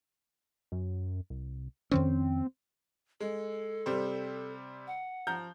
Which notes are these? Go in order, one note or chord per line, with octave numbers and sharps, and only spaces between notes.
F#2
C2
F2 D#3 C4 C#4
G#3 A4
C3 G3 C5
F#5
F3 A#5 G6